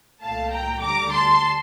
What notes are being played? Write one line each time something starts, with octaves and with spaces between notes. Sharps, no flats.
C2 A#2 A3 F5 A5
G5 A#5
D2 D3 G3 A#5 D6
A5 C6